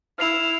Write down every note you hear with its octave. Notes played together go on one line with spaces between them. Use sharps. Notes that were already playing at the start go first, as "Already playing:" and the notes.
E4 F6 C7 F7